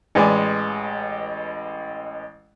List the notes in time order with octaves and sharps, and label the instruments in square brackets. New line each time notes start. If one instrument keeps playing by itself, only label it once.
[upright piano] A1 G#3 B4 D5 G#5